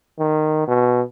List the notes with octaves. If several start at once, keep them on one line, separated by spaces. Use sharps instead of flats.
D#3
B2